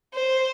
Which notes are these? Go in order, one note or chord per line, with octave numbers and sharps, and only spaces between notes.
C5